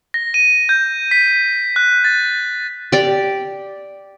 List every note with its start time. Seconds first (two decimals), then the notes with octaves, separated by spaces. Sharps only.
0.14 A#6
0.34 D#7
0.69 G6
1.11 B6
1.76 F#6
2.04 A6
2.92 G4 D5